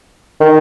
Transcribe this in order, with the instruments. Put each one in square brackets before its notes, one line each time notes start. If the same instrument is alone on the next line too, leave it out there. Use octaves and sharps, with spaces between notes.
[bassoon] D#3